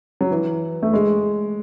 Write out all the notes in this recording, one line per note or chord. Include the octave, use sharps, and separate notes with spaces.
F#3
E3
A3
G#3